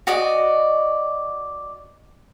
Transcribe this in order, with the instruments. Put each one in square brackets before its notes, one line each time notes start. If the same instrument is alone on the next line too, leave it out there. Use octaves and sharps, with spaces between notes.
[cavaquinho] F#4 D5 D#5